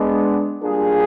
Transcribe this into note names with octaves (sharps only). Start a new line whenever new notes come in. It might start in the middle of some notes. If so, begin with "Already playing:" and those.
Already playing: G#3 B3 D4
G3 A#3 D4 F4 G#4